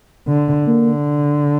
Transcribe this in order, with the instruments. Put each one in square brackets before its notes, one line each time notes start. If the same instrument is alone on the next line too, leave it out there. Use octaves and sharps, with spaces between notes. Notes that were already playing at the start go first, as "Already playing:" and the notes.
[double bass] D3
[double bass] D3 [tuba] A#3